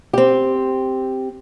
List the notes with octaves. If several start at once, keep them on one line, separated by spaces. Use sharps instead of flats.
C4 G4